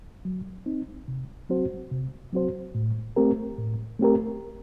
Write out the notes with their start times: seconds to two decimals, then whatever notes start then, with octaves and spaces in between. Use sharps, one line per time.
0.25 F#3
0.66 C4 D#4
1.08 C3
1.49 F#3 C4 F#4 C5
1.91 C3
2.33 F#3 C4 F#4 C5
2.75 A2
3.16 A3 C4 G4 A#4
3.58 A2
3.99 A3 C4 G4 A#4